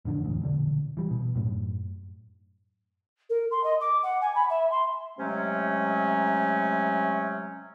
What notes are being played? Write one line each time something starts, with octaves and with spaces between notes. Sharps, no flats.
A1 F2 D3 D4
E1 A1 D2
E1 A#1 D3
E3 G3
B2
F#2 A2
A#4
C6
D#5
D6
F#5
G#5
B5
E5
C6
C3 F#3 G#3 A3 C#4